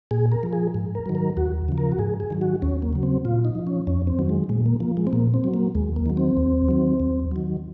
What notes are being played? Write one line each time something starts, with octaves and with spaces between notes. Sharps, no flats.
A#2 G#4
A#4
F3
G#4
G#2
A#4
D#3 F#3
A#4
D#2 F#4
C#3 F3
A#4
F#4
G#2 G#4
G#4
D#3 F#3
F#4
D#2 C#4
A#3
C#3 F#3
C4
A#2 F4
D#4
F3
C#4
F2 C#4
C4
D#3 F#3
G#3
A#2 G#3
A#3
F3 A#3
G#3
C4
A#2 A#3
C4
F#3
A#3
D#2 G#3
A#3
D#3 F#3
C4
D#2
D#3 F#3
D#2
D#3 F#3